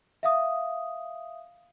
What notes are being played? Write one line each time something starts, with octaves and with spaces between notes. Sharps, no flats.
E5 F5 D#6